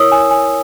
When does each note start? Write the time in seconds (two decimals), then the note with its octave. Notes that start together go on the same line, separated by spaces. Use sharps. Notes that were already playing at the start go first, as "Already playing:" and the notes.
Already playing: E4 A#4 C#5 D#6 E6
0.12 G#5
0.31 G#5